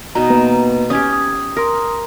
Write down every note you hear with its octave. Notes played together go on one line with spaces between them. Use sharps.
B2 D#4 A#5
A#3 B3 B4
C#4 G4 D#6 G#6
D#6
A#4 C6 D#6